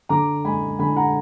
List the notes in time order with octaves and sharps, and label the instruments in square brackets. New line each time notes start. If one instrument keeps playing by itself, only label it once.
[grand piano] D3 A#5 D6
G#3 G#5 B5
D3 G#5 B5
F#5 A#5